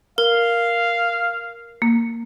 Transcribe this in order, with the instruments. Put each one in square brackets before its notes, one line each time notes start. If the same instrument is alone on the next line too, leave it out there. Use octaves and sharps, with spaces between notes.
[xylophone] A#4 [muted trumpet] F5
[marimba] A#3